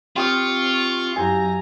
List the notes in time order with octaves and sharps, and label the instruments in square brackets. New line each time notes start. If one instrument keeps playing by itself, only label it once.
[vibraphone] C4 [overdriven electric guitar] F4 [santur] G4 D#6 [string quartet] C#6
[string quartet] F#2 A#5 [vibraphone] E4 G4 F5 [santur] G#5